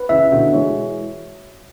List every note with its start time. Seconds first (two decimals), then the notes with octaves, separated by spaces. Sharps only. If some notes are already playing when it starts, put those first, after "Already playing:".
Already playing: B4
0.09 C#3 E3 E5
0.32 B2 D3 F#4
0.54 E3 G#3 C#5